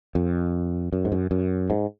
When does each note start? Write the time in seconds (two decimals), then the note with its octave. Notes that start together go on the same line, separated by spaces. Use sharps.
0.15 F2
0.93 F#2
1.05 G#2
1.12 F#2
1.31 F#2
1.70 G#2